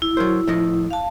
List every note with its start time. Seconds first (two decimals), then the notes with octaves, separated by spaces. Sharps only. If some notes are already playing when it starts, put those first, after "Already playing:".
0.02 E4
0.17 F#3 A#4 C5
0.47 A2 F3 D#5
0.91 F5 A5